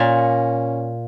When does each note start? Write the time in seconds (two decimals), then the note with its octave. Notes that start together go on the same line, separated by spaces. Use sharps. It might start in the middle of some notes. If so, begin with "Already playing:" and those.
Already playing: A#2 C#4